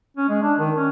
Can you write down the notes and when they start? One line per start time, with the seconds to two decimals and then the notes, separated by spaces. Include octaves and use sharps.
0.17 C#4
0.29 G#3
0.43 D4
0.59 D#3
0.76 C#4